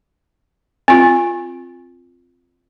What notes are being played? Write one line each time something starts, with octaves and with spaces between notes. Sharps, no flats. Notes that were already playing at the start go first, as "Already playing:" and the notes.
C4 F4